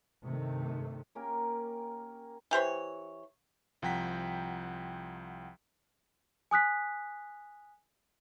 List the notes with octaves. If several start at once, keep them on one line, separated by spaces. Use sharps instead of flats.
G2 C3 D#3 A3
A#3 C#4 G4 A#4
E3 G4 C5 C#5
C2 F3 F#5 G5 A#5 B6
G#5 D#6 F#6 B6